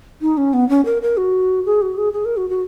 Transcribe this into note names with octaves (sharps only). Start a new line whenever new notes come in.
D#4
C#4
B3
C#4
A#4
A#4
F#4
G#4
F#4
G#4
G#4
A#4
F#4
F#4